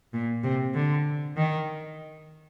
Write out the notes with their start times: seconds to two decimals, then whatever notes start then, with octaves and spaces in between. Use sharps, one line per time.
0.13 A#2
0.44 C3
0.74 D3
1.37 D#3